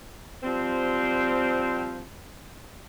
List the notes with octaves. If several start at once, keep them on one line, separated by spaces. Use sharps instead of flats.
F3 G3 C4